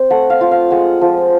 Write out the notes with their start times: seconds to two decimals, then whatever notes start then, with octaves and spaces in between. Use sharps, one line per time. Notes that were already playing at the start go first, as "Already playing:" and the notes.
Already playing: C4
0.10 A3 F#5
0.30 F5
0.41 F4
0.51 F5
0.71 G#3 F#5
1.01 F3